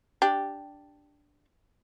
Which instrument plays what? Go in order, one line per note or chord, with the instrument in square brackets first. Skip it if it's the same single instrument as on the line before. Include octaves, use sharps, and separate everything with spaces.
[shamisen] D4 G4